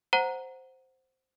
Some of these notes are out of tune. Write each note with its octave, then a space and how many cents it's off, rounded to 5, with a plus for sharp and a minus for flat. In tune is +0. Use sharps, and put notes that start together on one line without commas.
C5 +0 F#5 +0 A#5 +0